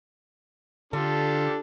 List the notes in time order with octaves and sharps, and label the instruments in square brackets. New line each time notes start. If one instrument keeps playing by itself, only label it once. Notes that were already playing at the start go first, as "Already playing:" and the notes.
[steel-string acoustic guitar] D3 [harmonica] D4 F4 G4 [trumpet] A4